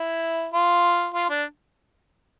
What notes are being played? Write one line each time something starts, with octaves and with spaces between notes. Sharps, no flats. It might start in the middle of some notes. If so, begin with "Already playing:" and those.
Already playing: E4
F4
F4
D4